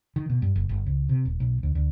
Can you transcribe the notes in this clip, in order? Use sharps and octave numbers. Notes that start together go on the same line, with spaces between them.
D#3
B2
G2
F#1
G1
C#2
C3
D#1
B1
D2
D2